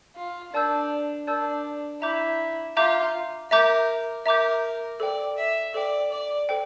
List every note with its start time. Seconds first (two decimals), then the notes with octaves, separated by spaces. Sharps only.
0.16 F4
0.53 D4 A#4 D5 A5 E6 G6
1.27 D4 A#4 D5 A5 E6 G6
2.02 E4 E5 A#5 D6 G6
2.77 F4 E5 A#5 D6 G6
3.50 A#4 E5 A#5 D6 G6
4.26 A#4 E5 A#5 D6 G6
5.00 A4 C5 D5 G5
5.37 E5
5.74 A4 C5 D5 G5
6.12 D5
6.49 A4 C5 G5